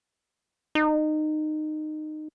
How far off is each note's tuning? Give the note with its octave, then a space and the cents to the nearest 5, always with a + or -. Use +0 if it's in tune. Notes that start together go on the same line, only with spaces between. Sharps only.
D#4 -20